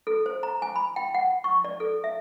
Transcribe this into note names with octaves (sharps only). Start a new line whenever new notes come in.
A4
C5
A#5
G#5
B5
G5
F#5
C#6
D5
A4
E5